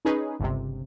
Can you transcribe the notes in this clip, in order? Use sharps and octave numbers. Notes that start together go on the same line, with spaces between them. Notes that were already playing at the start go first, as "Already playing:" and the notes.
C#4 D#4 G#4 B4
G1 C#2 C3